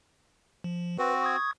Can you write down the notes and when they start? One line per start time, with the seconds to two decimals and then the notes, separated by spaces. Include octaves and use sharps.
0.64 F3
0.99 C4 F#4 B4
1.21 C#6 D#6 G#6